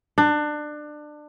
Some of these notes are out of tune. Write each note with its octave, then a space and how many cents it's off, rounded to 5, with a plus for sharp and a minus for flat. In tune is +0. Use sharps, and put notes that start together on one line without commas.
D4 +25